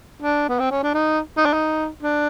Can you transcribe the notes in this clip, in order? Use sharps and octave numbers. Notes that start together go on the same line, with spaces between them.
D4
B3
C4
C#4
D4
D#4
D#4
D4
D#4
D4